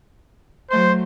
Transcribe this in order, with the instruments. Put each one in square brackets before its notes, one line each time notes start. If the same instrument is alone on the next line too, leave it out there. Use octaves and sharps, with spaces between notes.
[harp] F#3 A3 C6 [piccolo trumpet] C5